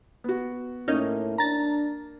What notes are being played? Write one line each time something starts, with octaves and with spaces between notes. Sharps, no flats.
B3 F#4
A2 A#3 C#4 D#4
D4 A#5 A6